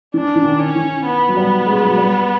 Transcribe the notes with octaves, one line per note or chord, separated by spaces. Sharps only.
E3 D4
E3
D#3
C#4
E3
B3
F#3
G3
G#3
F#3
G3